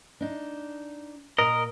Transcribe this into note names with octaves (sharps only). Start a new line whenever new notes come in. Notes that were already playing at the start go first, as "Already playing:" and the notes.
D4 D#4
A#2 A#4 D#5